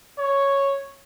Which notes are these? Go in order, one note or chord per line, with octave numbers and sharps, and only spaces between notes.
C#5